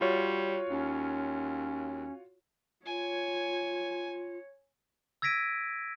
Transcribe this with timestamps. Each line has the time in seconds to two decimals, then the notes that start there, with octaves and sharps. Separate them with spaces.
0.01 G3 F4 F#4 C#5
0.70 D#2 C#4
2.86 F4 C#5 G#5
5.22 E6 G#6 A#6 B6 D7 D#7